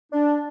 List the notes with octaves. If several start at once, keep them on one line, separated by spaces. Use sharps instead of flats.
D4